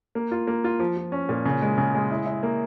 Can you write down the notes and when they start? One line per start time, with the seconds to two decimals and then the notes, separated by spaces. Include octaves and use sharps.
0.15 A#3
0.31 F4
0.47 A#3
0.64 F4
0.79 F3
0.97 F3
1.12 C#4
1.29 A#2
1.45 C#3
1.62 G#3
1.78 C#3
1.95 G#3
2.11 E4
2.26 E4
2.43 A#3